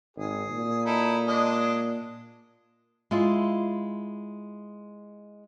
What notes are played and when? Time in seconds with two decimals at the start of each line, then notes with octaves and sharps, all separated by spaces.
0.17 G#1 G#4
0.51 A#2
0.86 D#4 E4 A4
1.27 G#3 D4 D#5
3.11 G#3 E4 F4